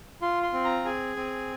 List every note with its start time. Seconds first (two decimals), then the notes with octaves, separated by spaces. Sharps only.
0.22 F4 C6
0.43 C6
0.53 C4
0.64 A#5
0.85 G#4 G#5
1.16 C4